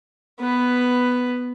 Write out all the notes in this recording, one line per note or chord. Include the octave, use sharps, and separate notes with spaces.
B3 B4